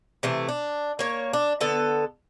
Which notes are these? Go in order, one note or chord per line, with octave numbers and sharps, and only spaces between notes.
C3 E3 A3
D4
A#3 C#5
D4
D3 B3 A4